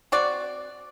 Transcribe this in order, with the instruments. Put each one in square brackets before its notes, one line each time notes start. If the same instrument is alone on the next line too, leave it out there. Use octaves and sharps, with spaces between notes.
[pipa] C4 F#4 D5